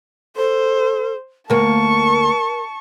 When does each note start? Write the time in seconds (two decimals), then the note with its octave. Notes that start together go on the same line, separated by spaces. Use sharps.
0.36 A4 C5
1.50 D2 A#3 A#4 A5 C#6